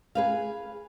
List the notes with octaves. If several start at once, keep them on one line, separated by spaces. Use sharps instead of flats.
G#4 B4 F5